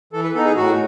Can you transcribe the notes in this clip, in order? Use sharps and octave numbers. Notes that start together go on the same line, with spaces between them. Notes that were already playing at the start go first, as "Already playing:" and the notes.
E3 A4
B4
B3 D#4 A4
G#4
A2 F#4